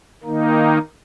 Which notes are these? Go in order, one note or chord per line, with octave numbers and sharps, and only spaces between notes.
D#3 A#3 D#4